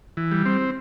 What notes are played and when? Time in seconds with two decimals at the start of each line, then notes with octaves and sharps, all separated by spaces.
0.17 E3
0.32 G3
0.45 C4